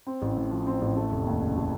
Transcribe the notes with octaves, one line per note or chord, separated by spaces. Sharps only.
C4
A1
A2
F3
C4
A1
A3
F1
D#2
C#3
A3